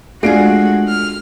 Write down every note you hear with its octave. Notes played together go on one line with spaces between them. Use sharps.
G#3 A3 D4 F4 F#4 G#4 C7 D7
F6